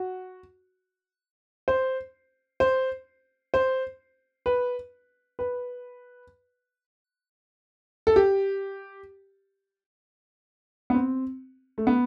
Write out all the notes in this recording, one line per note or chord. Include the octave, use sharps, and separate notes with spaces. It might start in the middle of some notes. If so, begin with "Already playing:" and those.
Already playing: F#4
C5
C5
C5
B4
B4
A4
G4
B3
C4
A3
B3